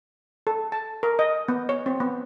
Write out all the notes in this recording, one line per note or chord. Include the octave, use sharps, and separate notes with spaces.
A4
A5
A#4
D#5
B3
C#5
C4
B3